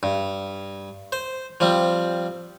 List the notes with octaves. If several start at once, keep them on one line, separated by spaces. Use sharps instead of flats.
G2
C5
F3 G3 C4